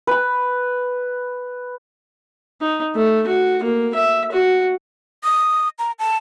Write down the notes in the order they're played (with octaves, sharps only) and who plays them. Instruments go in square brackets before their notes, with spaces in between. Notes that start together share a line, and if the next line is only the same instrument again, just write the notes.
[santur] B4 B5
[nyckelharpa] D#4
A3
F#4
A#3
E5
F#4
[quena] D#6
A#5
A5